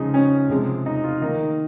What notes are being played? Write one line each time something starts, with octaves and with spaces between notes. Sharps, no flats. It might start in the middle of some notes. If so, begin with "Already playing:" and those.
Already playing: C#3 F3 G#3 D#4
C#4
C3 F3 G#3
D#4
F4
D#3 A#3 D#4